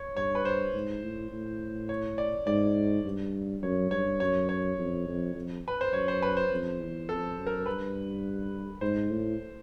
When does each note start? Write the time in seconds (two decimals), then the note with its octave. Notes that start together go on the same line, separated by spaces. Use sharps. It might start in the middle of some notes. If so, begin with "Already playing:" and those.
Already playing: C#5
0.16 G2 C#5
0.35 B4
0.45 C5
0.74 G#2
1.03 A2
1.32 A2
1.89 C#5
2.18 D5
2.47 G#2 D5
3.05 G2
3.62 F#2 C#5
3.91 G2 C#5
4.20 F#2 C#5
4.49 C#5
4.78 F2
5.07 F2
5.35 F2
5.68 B4
5.81 C5
5.93 F#2 C#5
6.08 C5
6.22 B4
6.37 C5
6.51 F2
6.80 E2
7.09 F2 A4
7.38 F#2
7.47 A#4
7.66 G2 B4
8.81 G#2 C5
9.10 A2